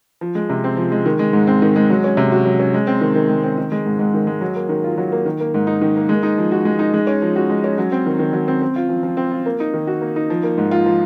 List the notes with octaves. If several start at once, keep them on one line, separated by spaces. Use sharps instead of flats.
F3
G#3
C3
C4
F3
G#3
D#3
G#3
G#2
C4
D#3
G#3
F#3
C#4
C3
F#4
F#3
C#4
G#3
C4
D#3
D#3
G#3
C4
D#3
G#3
G#2
G#2
D#3
G#3
F#3
A#3
D#3
F4
F#3
A#3
D#3
A#3
G#2
D#4
D#3
A#3
G#3
D#4
F3
F#4
G#3
D#4
G#3
C#4
F3
F#4
G#3
C#4
F#3
C4
D#3
D#3
F#3
C4
C4
F4
F3
F3
C4
F4
A#3
D#4
D#3
F#4
A#3
D#4
F3
A#3
G#2
F4
F3